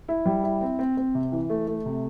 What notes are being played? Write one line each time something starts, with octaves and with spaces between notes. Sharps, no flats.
E4
G3
E4
C4
C4
C4
C3
E3
A3
A3
C3